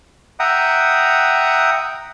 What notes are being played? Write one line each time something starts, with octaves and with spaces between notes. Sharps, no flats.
E5 F#5 G5 A#5 D#6